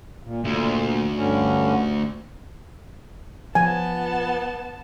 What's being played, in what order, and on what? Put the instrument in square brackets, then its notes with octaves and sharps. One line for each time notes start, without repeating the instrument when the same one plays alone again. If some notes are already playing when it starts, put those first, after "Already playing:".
[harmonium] A#2
[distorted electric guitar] D2 [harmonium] A#2
[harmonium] G2 D3 C#4
[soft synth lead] F3 [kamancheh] B3 A5 [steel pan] G#5